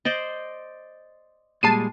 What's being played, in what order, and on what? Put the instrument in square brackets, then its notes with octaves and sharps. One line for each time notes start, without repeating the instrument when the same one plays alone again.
[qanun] C5 D5 D#5
[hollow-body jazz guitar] A#2 G3 G#3 [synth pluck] A5 C7 D#7